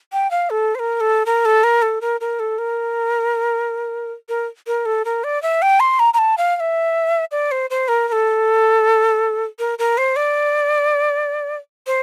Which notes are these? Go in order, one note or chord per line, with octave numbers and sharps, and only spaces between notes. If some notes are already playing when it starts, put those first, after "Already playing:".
G5
F5
A4
C5
A#4
A4
A#4
A4
A#4
A4
A#4
A#4
A4
A#4
A#4
A#4
A4
A#4
D5
E5
G5
C6
A#5
A#5
A5
F5
F5
E5
D5
C5
C5
A#4
A#4
A4
A#4
A#4
C5
D5
C5